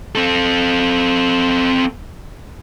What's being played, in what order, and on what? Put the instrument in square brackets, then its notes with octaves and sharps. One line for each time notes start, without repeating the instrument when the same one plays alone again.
[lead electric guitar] C4 A4